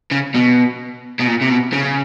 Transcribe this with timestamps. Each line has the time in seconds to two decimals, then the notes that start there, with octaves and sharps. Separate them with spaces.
0.12 C#3
0.35 B2
1.19 B2
1.27 A#2
1.41 C3
1.50 B2
1.73 C#3